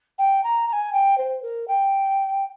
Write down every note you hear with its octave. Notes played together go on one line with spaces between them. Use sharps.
G5
A#5
A#5
G#5
G5
C5
A#4
G5